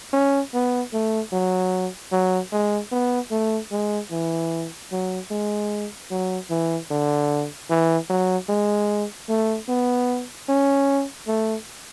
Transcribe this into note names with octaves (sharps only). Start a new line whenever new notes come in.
C#4
B3
A3
F#3
F#3
G#3
B3
A3
G#3
E3
F#3
G#3
F#3
E3
D3
E3
F#3
G#3
A3
B3
C#4
A3